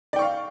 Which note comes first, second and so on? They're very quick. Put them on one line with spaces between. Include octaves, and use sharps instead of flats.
D5 G5 C#6 F5